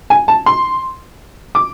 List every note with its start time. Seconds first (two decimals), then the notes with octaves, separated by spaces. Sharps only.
0.10 G#5
0.28 A5
0.46 C6
1.55 D6